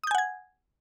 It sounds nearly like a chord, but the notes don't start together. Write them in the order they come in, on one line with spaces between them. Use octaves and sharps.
D#6 G6 G#5 F#5 G#6